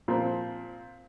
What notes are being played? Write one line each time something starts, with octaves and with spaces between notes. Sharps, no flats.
A#2 F3 C4